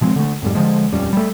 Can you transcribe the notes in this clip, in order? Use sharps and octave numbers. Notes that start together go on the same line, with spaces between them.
B2 F3 G#3 C4
D3 A3
F2 G#2 G3
D3 D#3 F3 G#3
D#1 F2 G3 C#4
G3 A3